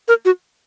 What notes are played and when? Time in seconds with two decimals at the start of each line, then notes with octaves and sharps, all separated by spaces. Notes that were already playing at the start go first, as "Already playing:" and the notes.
0.08 A#4
0.25 F#4